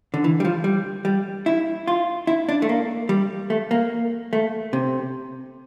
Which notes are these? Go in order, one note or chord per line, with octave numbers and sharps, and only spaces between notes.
D3
E3
G3
F3
G3
G3
E4
F4
E4
D4
A3
A#3
G3
A3
A#3
A3
C3